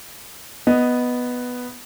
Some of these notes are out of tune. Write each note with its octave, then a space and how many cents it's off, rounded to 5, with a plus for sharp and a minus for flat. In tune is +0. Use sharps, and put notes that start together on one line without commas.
B3 +0 D#5 +0